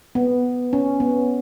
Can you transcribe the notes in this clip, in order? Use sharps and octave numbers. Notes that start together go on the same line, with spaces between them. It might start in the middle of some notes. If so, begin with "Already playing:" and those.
B3
C#4
B3